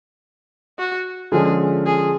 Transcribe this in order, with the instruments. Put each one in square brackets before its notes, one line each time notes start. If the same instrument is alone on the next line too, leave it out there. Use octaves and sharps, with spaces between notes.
[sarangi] F#4
[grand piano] D3 F3 G#3 C#4 [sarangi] G#4
[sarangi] G#4